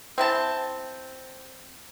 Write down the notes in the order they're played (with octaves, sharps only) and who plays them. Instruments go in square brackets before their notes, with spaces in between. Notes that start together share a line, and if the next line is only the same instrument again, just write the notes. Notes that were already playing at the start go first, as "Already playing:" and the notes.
[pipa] C4 E4 A5